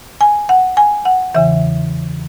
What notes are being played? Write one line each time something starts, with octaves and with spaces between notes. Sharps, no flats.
G#5
F#5
G#5
F#5
E2 C#3 E3 E5